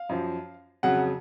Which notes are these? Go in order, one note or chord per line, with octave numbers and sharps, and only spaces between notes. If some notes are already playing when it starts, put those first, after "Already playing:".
Already playing: F5
F#2 F3
F2 C#3 F#3 F#5